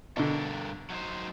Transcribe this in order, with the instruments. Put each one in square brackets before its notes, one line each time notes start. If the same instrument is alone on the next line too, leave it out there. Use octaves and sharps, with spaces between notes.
[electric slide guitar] G2 A4 A#4 [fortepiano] B2 D3
[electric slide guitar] F#3 D#4 C5